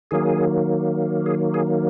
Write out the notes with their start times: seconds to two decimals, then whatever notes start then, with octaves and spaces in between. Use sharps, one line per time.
0.11 D#3 F#3 A#3 G#4
1.26 G#4
1.54 G#4